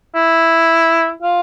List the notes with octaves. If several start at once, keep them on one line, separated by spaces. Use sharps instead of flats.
E4
F4